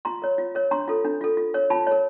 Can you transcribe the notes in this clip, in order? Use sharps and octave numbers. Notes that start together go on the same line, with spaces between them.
F4 A#5 C6
A#4 C#5
F4
A#4 C#5
D4 A#5 C6
F4 A4
D4
F4 A4
F4
A#4 C#5
F4 A5 B5
A#4 C#5